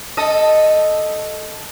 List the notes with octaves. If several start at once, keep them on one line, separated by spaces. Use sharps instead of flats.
A4 D#5